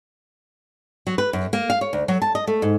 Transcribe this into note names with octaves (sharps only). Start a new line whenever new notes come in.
F#3
B4
F#2
A#3
F5
C#5
D2
F#3
A5
D#5
A3
G#2